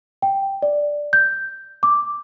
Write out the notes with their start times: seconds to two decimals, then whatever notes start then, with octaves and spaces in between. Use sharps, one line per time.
0.22 G5
0.62 D5
1.13 G6
1.83 D6